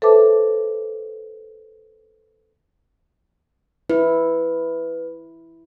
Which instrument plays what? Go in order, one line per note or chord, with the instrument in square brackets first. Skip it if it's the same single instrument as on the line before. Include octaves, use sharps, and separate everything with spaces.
[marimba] A4 B4 C5 E5 A5 D6
[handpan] E4 [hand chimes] B4